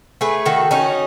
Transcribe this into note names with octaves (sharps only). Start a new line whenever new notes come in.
A3 G#4 B4
D#3 F#4 A4
C#4 D#4 F#4